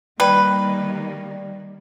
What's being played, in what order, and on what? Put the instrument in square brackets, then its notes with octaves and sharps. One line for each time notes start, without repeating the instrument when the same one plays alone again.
[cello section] D#3 G3 A#3 [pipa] B4 [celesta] D5 G5